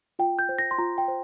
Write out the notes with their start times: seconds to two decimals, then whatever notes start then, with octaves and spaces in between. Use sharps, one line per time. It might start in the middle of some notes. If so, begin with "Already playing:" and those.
0.19 F4 G5
0.39 G6
0.49 C5
0.59 A#6
0.71 C6
0.78 F4 A#5
0.98 G5
1.08 C5